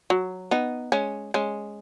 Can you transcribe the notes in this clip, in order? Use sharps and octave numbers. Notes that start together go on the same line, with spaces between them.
F#3
B3 D#4
G#3 C#4
G#3 C#4